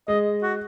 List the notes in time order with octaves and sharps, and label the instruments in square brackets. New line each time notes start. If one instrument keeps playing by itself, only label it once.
[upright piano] G#3 [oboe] D#5
[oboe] F#4